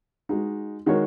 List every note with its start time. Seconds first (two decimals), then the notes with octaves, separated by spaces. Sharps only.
0.29 G#3 D#4 F#4
0.86 D#3 G#3 F#4 A#4 C#5